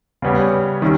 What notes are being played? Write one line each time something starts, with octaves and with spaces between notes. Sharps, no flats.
C#3 G3 B3 G4 C#5
D#3 G3 C#4 E4